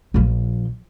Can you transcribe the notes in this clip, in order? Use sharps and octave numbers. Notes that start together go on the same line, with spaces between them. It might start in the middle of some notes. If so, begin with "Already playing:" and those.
A#1 F3